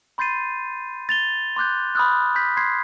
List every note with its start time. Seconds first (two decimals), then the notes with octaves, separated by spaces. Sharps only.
0.18 B5 C6 G6 A6 C7 D#7
1.09 A6 F7 G7
1.56 C6 D6 F#6 G6
1.95 B5 C6 D#6 F6 F#6
2.35 B5 G6 B6
2.57 C6 G#6 C7